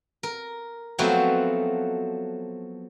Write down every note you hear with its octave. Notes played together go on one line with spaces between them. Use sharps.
A#4
F3 F#3 A3 B3 C4 F#4